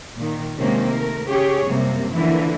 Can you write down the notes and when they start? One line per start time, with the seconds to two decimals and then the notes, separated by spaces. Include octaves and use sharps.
0.17 A#2 D#3
0.58 C3 D#3 G#3 A#3 C4 C#4
0.88 A3 A#4
1.28 C#3 G4 G#4 C#5
1.67 F#2 C3 G3 A#3
2.13 D3 E3 F3 A#3 E4